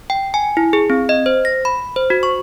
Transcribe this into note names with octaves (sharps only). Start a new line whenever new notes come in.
G5
G#5
E4
G#4
C4
D#5
C5
A#6
B5
C5
F#4
C#6